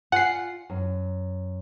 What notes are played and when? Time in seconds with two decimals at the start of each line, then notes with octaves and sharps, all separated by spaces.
0.12 F4 D5 F#5 G#5 C7
0.70 F#2